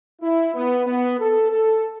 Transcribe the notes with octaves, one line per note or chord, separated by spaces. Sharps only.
E4
B3
B3
A4
A4